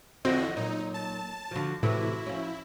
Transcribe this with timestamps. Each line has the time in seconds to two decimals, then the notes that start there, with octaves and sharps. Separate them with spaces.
0.25 E2 D3 F3 C4 E4 F#4 D#5
0.57 A#2 F#3 D#4
0.94 A5
1.51 D3 F3 F#4
1.83 A2 C3 E3 A3 E4 F#4
2.26 F3 C#4